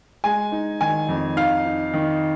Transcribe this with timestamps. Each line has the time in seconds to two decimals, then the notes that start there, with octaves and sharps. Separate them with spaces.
0.24 G#3 G#5
0.52 D#4
0.81 D#3 G#5
1.08 F2
1.37 D#4 F5
1.65 D#4
1.94 D#3